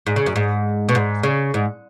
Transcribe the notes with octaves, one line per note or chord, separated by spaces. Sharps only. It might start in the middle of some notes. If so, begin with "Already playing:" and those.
G#2
C#3
F#2
G#2
B2
G#2
C#3
G#2